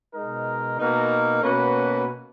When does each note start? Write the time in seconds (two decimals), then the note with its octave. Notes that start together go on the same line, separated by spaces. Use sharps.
0.12 B2 G#3 D#4 A#4
0.77 B2 A#3 D#4 A#4
1.42 B2 A#3 C#4 F#4 B4